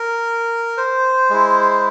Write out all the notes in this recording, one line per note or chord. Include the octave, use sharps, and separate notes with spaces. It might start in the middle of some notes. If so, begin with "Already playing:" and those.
Already playing: A#4
C5
G#3 E4